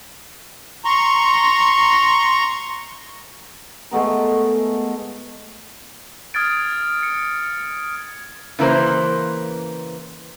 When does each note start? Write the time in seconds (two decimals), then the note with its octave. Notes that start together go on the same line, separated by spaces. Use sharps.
0.85 A#5 C6 C#6
3.91 G#3 A3 B3 A#4
6.34 D#6 F6 G#6 A6 D7
6.57 G#6
7.03 C#7
8.59 C#3 E3 A#3 B4 C5